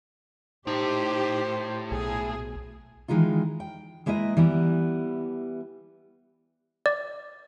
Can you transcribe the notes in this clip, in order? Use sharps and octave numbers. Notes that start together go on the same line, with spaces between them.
A2 D#4 G4 C5
B1 G#4
D#3 E3 G#3 D#4 F4
G5
G#3 A#3 E4 B4 D#5
E3 G3 B3 E4
D5